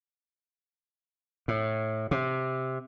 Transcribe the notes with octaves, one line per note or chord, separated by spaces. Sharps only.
A2
C3